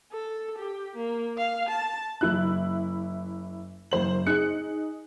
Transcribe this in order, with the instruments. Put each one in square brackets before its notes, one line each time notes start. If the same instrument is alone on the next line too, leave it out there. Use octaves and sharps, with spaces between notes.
[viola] A4
G4
A#3
F5
A5
[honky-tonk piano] F#1 E4 F#6
F#1 C5 F#7
D#4 G#4 F#6 C#7